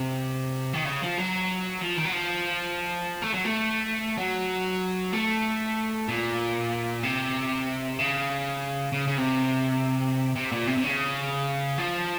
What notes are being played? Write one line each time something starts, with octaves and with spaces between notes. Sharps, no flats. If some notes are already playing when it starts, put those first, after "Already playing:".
Already playing: C3
D#3
C#3
F3
F#3
F3
D#3
F#3
F3
A3
F#3
A3
F#3
A3
A#2
C3
C#3
C#3
C#3
C3
C3
A#2
C3
C3
C#3
F3